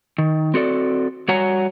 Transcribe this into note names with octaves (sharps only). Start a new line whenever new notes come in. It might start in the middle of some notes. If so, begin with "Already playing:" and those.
D#3
C4 F#4 A4 D5
G3 F#4 C#5 F#5 G#5 A#5